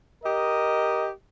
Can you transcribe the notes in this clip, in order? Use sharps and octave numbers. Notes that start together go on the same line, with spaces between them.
G4 A#4 D#5